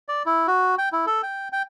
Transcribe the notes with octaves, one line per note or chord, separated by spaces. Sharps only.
D5
E4
F#4
G5
E4
A4
G5
G5